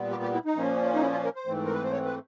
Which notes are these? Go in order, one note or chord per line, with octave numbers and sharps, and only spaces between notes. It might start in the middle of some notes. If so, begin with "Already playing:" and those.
Already playing: A#2 G3 B3
G4
G4
E4
D#4
A#2 F3 A#3 C#4
D#4
E4
F4
A#4
C5
G#2 E3 A3 C4
A#4
B4
C5
C#5
B4